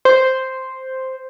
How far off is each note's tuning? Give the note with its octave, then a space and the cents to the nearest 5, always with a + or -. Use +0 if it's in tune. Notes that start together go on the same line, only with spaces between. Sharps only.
C5 +0